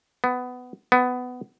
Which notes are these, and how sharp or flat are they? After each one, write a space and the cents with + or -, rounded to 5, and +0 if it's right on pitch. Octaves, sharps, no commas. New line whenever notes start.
B3 +15
B3 +15